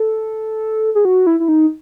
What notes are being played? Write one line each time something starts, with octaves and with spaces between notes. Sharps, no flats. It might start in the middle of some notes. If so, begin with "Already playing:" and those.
Already playing: A4
G#4
F#4
E4
E4
D#4